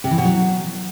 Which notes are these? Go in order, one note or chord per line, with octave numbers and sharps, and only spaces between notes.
C3
E3
B2
F#3